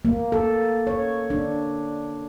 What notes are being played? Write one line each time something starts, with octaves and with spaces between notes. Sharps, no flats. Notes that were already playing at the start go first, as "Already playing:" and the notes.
A#3
A4
C#5
D4